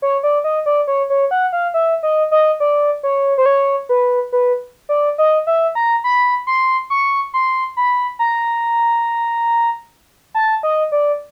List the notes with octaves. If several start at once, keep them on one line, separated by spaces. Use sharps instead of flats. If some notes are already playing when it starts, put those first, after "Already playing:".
C#5
D5
D#5
D5
C#5
C#5
F#5
F5
E5
D#5
D#5
D5
C#5
C5
C#5
B4
B4
D5
D#5
E5
A#5
B5
C6
C#6
C6
B5
A#5
A5
D#5
D5